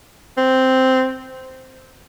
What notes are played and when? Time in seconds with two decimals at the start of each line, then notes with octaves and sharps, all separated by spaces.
0.37 C4